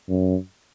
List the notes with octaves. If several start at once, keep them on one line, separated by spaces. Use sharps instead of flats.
F#2